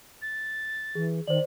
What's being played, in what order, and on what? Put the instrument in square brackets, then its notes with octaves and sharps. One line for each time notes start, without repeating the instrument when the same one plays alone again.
[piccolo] A6
[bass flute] E3 [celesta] G#4
[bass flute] D#3 [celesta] C5 D5 [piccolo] F#7